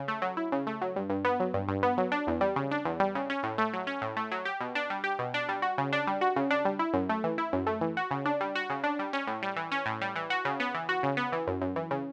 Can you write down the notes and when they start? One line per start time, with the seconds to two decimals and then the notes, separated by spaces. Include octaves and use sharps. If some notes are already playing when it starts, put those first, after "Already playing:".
Already playing: C#3
0.08 A3
0.22 F#3
0.37 E4
0.52 C#3
0.67 A3
0.81 F#3
0.96 G2
1.10 G2
1.25 B3
1.40 F#3
1.54 G2
1.68 G2
1.83 B3
1.98 F#3
2.12 D4
2.27 E2
2.41 G3
2.56 C#3
2.71 D4
2.85 E2
3.00 G3
3.15 C#3
3.30 C#4
3.43 A2
3.58 A3
3.73 F#3
3.87 C#4
4.02 A2
4.17 A3
4.32 F#3
4.45 G4
4.61 B2
4.75 D4
4.90 G3
5.04 G4
5.19 B2
5.34 D4
5.49 G3
5.62 F#4
5.78 C#3
5.93 D4
6.07 G3
6.21 F#4
6.36 C#3
6.51 D4
6.65 G3
6.79 E4
6.94 F#2
7.09 A3
7.24 E3
7.38 E4
7.53 F#2
7.67 A3
7.81 E3
7.97 F#4
8.11 C#3
8.25 D4
8.41 G3
8.55 F#4
8.70 C#3
8.84 D4
8.99 G3
9.13 C#4
9.27 A2
9.42 G3
9.56 E3
9.72 C#4
9.86 A2
10.01 G3
10.16 E3
10.30 F#4
10.45 C#3
10.60 B3
10.74 E3
10.89 F#4
11.03 C#3
11.17 B3
11.32 E3
11.47 F#2
11.61 F#2
11.76 E3
11.91 C#3